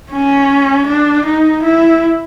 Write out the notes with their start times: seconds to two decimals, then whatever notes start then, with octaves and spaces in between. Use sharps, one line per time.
0.11 C#4
0.87 D4
1.26 D#4
1.63 E4